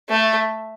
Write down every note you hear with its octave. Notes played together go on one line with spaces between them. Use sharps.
A3